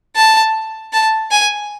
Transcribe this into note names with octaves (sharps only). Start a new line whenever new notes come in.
A5
A5
G#5